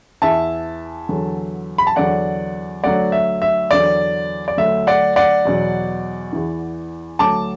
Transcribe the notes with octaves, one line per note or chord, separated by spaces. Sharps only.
E2 E3 E5 A5
E2 D3 F#3
B5
A5
E2 D3 F#3 D5 F#5
D2 D3 F#3 D5 F#5
E5
E5
E2 D3 F#3 D5
D5
D2 D3 F#3 E5
D5 F#5
D5 F#5
E2 B2 F#3
E2 E3
D2 D3 F#3 A5 D6